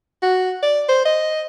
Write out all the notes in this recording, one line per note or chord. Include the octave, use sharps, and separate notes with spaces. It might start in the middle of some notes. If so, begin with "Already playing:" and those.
F#4
D5
C5
D#5